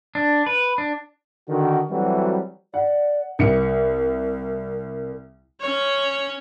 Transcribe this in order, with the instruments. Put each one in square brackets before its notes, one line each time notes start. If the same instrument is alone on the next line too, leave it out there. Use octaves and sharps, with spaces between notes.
[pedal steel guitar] D4
B4
D4
[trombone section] D3 D#3 F#4
E3 F#3 G3 A3 C4 F#4
[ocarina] D5 [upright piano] F#5
[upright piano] C2 C#7 [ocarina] A#4
[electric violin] C#4 C#5